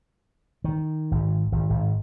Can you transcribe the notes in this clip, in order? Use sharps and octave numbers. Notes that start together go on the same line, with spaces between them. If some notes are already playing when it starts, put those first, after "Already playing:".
D#3
G#1
G#1
G#1